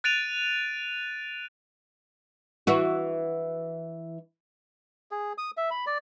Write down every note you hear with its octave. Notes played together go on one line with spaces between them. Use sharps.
F#6 A6 D7 D#7 F7
E3 E4 F#4
G#4
D#6
E5
B5
D5